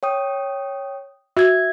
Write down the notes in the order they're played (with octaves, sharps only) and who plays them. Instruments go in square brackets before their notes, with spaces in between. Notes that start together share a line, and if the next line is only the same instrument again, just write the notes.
[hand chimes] C#5 G5 D#6
[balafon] F#4 [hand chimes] E5 G#6